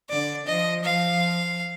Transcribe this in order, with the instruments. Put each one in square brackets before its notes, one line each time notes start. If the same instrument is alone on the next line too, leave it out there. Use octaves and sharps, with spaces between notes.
[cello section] D3 [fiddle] D5
[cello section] F3 [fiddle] D#5
[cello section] F3 [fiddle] F5